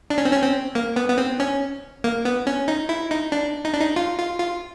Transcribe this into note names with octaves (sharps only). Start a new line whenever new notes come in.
D4
C#4
C4
C#4
C4
A#3
B3
B3
C4
C#4
A#3
B3
C#4
D#4
E4
D#4
D4
D#4
D4
D#4
F4
F4
F4